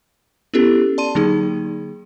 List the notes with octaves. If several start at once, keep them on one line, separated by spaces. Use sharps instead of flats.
B3 C#4 E4 G4 A4
D5 A5 C6 D#7
D3 F#3 A#3 D#4 G#4